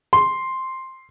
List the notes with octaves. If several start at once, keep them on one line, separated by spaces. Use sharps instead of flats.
C6